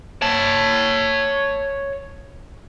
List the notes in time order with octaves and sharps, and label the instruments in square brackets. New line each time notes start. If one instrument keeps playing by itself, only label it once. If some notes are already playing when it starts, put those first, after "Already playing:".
[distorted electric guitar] C#5 A5